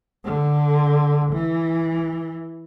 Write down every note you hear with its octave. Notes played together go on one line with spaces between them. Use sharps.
D3
E3